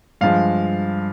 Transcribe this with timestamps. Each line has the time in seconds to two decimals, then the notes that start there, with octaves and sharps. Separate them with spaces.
0.21 G2 F3 G#3 F5